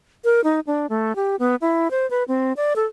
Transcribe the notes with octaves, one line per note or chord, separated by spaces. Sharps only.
A#4
D#4
D4
A3
G4
B3
E4
C5
B4
C4
D5
A4